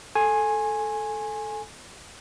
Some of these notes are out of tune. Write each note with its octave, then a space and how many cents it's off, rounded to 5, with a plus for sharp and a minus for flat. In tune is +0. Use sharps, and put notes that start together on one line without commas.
A4 -5 G#5 +0 C6 +45